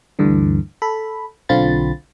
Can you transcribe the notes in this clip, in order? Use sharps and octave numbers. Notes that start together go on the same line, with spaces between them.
D2 G2 D3 E3
A4 B5
B1 D3 C4 F4 B5 A6